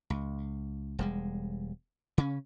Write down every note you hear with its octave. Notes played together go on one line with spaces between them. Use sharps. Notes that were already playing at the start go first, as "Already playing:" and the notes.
C#2
E1 G3 G#3
C#3 C#4